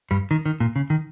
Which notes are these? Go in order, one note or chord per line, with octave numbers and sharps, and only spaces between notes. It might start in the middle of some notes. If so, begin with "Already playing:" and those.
G2 G3
D#3
D#3
A#2
C#3
D#3